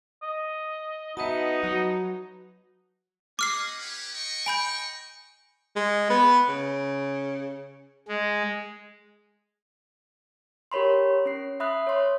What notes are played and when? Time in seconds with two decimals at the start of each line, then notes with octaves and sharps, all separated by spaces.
0.22 D#5
1.17 B3 D#4 F#4 B4 D#5 E5 A5
1.63 F#3 F#4 F#5
3.39 C#4 D#5 F#5 D6 F6 C7
3.77 C#4 G4 B4
4.12 D#5 G5 C#6
4.46 G#5 B5 G6
5.76 G#3
6.10 B3
6.48 C#3
8.08 G#3
10.72 G4 A#4 C#5 B5 C6
11.26 C#4 C7
11.60 E5 B5 D#6 F#6
11.87 C#5 C6